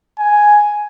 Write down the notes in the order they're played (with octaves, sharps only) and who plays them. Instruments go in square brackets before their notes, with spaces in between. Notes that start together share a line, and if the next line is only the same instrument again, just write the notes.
[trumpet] G#5